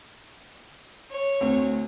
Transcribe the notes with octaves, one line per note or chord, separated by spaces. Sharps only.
C#5
D2 C4